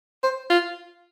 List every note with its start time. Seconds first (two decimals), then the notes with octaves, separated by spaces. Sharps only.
0.24 C5
0.50 F4